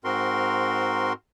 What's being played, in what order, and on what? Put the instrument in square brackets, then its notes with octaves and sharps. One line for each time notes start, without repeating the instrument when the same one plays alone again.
[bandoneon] G#2 C4 F#4 A#4 C6